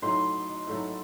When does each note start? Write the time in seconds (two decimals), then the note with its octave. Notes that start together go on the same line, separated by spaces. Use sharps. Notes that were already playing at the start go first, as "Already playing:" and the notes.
0.02 A2 F#3 A3 D#4 C6
0.67 A2 F#3 A3 D#4